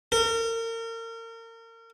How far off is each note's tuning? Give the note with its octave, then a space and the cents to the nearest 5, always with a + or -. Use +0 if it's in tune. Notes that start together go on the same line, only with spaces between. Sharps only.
A#4 -35